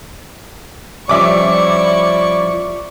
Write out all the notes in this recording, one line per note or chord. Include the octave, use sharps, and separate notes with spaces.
F3 G3 C#4 E4 D5 E5 C#6 D6